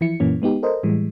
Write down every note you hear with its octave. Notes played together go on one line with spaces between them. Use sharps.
E3 F3 E4 C#7
F#2 A#2 E3 A#3 C#4
G#3 B3 D#4 G4
A4 A#4 C5 D#5
A2 E3 G3 G#3